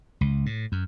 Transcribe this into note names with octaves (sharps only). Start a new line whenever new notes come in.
C#2
A2
F#2